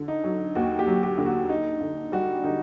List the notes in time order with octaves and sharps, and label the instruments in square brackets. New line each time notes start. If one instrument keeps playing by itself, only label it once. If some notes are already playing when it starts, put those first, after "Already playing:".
Already playing: [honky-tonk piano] D3
[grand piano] D#4
[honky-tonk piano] F#3
[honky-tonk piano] D#2 [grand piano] F#4
[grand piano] G4
[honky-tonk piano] F#3
[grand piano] G4
[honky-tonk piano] D3
[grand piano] F#4
[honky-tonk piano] D3 [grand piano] D#4
[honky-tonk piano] D3
[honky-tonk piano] G3 [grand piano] F#4
[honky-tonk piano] D3 [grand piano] D#4